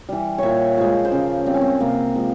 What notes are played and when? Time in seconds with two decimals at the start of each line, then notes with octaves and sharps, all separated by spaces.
0.09 E3 G3
0.38 A#2 C#5 E5
0.77 F3 G#3 C5
1.05 C5
1.12 C#3 A#4
1.46 G3 C4
1.54 C#4
1.61 C4
1.80 C3 A#3
2.15 F3 G#3